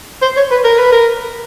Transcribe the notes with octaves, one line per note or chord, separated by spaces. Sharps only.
C5
C#5
B4
A#4
B4
A#4